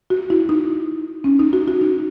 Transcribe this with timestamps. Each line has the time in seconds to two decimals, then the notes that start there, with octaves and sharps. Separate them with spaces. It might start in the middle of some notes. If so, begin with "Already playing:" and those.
0.10 F#4
0.30 E4
0.49 D#4
1.24 C#4
1.39 D#4
1.53 F#4
1.67 F#4
1.81 D#4